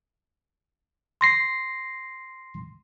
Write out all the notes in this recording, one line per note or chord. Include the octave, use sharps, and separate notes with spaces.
C6 A#6 C7